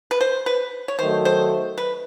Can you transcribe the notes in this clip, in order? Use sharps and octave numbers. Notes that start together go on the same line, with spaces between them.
B4
C5
B4
C#5
D#3 F#3 A3 C5
C5
B4